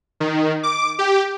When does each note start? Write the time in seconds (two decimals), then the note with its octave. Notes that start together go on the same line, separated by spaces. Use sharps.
0.20 D#3
0.63 D6
0.99 G4